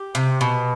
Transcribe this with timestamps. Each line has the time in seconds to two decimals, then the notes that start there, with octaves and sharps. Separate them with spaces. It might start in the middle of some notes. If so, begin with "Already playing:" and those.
Already playing: G4
0.15 C3
0.41 B2